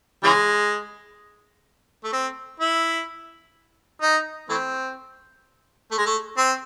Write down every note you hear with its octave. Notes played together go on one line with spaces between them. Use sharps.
C#3 E3 G#3
A3
C4
E4
D#4
E3 A3 C4
A3
G#3
A3
C4